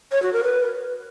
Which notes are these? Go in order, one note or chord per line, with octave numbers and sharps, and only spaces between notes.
C#5
F#4
A#4
B4